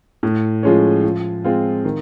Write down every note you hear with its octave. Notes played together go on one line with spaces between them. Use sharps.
A2
F3 G#3 C#4
F3
G#3 C4 F4
D#3